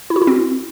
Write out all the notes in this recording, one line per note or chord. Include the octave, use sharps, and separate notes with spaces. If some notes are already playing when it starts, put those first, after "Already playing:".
E4
F#4
E4
C4